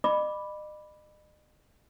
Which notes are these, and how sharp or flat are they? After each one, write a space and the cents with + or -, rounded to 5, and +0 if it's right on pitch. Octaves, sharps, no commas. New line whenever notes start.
D#5 -45 B5 +0 D6 +0